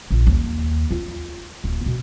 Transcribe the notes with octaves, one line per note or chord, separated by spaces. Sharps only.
A#1
D#2
F4
D1
B2